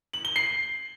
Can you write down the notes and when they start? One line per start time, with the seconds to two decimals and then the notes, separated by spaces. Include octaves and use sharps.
0.13 F#7
0.25 G7
0.36 C7